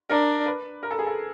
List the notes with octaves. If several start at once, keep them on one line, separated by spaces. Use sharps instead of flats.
D4 A#4
B4
A#4
A4
G#4
A4